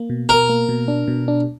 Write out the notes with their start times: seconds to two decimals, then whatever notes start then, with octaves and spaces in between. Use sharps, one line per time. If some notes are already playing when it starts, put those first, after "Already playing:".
Already playing: A#3
0.10 B2
0.29 B2 A#4
0.49 A#3
0.69 B2
0.88 D4
1.08 B2
1.28 D4